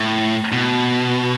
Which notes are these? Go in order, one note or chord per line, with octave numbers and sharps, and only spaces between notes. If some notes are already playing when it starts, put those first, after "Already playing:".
Already playing: A2
B2